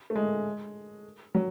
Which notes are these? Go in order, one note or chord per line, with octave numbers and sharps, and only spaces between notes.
A3
G#3
F#3